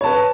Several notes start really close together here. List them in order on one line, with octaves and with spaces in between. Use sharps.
C#5 A5 B4